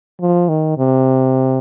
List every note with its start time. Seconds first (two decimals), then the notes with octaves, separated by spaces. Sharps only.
0.20 F3
0.49 D#3
0.77 C3